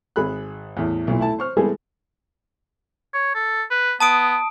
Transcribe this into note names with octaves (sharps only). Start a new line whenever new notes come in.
G#1 G#4 B5 F#6
E2 A2
B1 A#2 E4
A3 E4 A5
C5 C#6 F6
G3 G#3 B3 E4 G#4 A4
C#5
A4
B4
B3 A5 D#6 D7